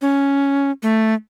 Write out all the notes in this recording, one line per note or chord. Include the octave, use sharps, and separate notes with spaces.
C#4
A3